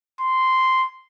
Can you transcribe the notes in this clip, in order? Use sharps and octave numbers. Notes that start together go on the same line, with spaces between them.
C6